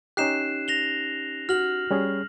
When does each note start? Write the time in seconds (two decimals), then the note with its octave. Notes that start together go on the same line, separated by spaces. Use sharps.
0.17 C#4 D#4 G4 F#6 C7 E7
0.68 A#6 F7 G7
1.49 F#4 F6 F#7
1.91 G3 C#4 G#4